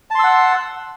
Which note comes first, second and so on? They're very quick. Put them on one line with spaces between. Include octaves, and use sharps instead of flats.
A5 C6 E6 F#5